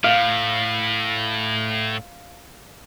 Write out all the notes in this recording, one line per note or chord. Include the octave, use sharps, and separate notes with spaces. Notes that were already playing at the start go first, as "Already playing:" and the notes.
A2 F5